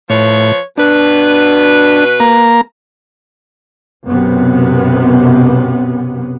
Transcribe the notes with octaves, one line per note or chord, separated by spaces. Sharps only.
A2 F3 B4 C#5
B2 D4 B4
A#3 A#5
B1 F#2 C3 B3